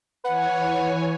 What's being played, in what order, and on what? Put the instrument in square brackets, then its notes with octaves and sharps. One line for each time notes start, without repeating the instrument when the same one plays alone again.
[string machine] E3 C#5 G#5 [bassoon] B4 [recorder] F#5